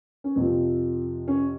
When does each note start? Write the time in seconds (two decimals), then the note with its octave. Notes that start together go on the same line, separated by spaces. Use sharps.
0.24 C#4
0.36 F2 C3 F3 C4
1.28 C#4